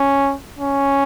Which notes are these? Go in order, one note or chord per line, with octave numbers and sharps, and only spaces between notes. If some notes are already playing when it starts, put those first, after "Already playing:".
Already playing: C#4
C#4